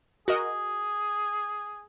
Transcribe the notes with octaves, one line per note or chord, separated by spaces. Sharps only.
F#4 G#4 A#4 D#5